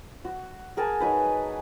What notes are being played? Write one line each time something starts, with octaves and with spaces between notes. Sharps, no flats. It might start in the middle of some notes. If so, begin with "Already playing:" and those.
F#4
G#4 A#4 G#5 A5
F#3 D#4 B4